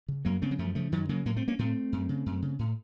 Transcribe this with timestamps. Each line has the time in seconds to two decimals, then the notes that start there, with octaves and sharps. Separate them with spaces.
0.08 C#3
0.25 F#2 F#3 A#3
0.42 C#3 A3 C4
0.51 F#3
0.59 F#2 F3 A3
0.75 C#3 F3 A3
0.92 F#2 D#3 F#3
1.09 C#3 F#3 A#3
1.26 A2 F#3 A#3
1.36 A3 C4
1.48 A#3 C#4
1.59 A2 A3 C4
1.92 F#2
2.09 C#3
2.26 F#2
2.42 C#3
2.59 A2